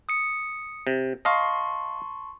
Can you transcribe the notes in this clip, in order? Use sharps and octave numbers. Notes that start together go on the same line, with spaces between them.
D#6 C#7
C3
D#5 F5 A5 C6 C#6